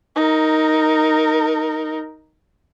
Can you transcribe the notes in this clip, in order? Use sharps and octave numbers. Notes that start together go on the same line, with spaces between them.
D#4 A#4